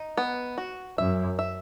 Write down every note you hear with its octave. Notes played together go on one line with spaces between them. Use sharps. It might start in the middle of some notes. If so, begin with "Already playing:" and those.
Already playing: D#4
B3
F#4
F#2 E5
E5